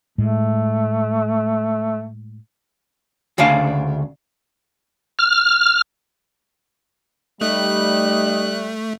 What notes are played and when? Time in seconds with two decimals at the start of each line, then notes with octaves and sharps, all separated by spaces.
0.18 A2 G#3 A3
3.38 D2 C#3 D4 F5
5.19 F6
7.41 G3 A3 D#4 F#6